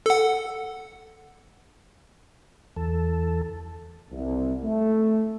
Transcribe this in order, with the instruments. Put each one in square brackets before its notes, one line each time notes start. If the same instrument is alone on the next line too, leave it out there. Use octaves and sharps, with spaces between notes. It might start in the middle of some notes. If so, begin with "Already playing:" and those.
[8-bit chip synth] A4 F#5
[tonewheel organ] E2 A4
[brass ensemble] C2
A3